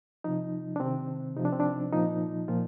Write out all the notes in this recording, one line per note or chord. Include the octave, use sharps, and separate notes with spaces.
C3 F3 D#4
D4
C3 D#3 C4
C3 F3 D#4
D4
C4
D4
A#2 F3 D#4
A#2 F3 F4